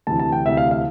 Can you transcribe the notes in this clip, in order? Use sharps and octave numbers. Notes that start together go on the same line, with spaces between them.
D2 C3 E3 A5
A5
G5
D2 C3 E3 E5
F5
F5